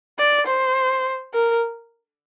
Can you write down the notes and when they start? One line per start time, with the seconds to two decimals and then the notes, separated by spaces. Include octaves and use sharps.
0.19 D5
0.47 C5
1.34 A#4